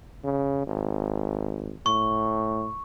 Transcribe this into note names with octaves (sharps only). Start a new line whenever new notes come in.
C#3
G#1
A2 C#6